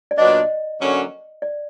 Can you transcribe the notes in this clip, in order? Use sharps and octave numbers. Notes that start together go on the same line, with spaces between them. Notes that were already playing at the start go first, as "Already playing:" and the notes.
D5
A#2 F#3 B3 D4 D#5
D3 F#3 A#3 C#4
D5